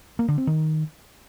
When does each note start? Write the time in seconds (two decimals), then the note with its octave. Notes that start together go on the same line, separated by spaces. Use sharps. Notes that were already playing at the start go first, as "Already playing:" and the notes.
0.19 A#3
0.28 D3
0.38 C4
0.47 D#3